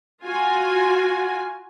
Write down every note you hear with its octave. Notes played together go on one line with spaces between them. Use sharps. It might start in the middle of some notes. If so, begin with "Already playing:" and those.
F4 F#4 G#5